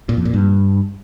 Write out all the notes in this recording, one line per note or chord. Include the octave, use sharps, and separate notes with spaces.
A#2
F2
A#2
G2